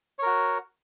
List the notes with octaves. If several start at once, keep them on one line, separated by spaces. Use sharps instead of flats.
F#4 A#4 C#5